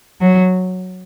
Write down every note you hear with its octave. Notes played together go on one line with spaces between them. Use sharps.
F#3